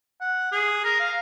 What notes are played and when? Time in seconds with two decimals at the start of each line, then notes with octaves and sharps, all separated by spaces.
0.21 F#5
0.52 G#4
0.84 A#4
0.99 F5